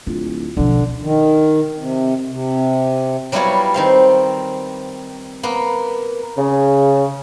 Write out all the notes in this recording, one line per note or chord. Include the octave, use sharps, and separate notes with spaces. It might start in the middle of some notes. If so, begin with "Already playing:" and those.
D1 F4
B1 D3 F3
D#3
C3
C3
F#3 G3 B3 E4 F4 C#5
D#3 C4 F5
A#3 B3
C#3